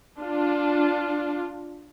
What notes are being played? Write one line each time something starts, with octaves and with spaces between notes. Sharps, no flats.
D4 F4